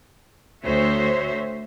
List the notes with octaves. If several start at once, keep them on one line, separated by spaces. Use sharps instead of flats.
D2 F#4 C5 C#5 E5